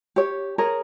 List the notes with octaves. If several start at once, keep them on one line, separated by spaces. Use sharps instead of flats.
G4 C#5
G#4 A#4 C#5